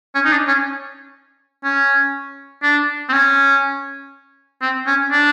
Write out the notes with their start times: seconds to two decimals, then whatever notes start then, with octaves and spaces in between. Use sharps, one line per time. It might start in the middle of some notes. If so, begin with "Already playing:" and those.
0.15 C#4
0.25 D#4
0.32 D4
0.48 C#4
1.64 C#4
2.63 D4
3.09 C4
3.13 C#4
4.62 C4
4.87 C#4
5.12 D4